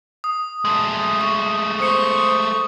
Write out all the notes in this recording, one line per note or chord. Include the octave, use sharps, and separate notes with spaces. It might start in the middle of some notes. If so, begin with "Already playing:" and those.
D#6
G#3 A3
C#6
C5 C#6 D#6 C#7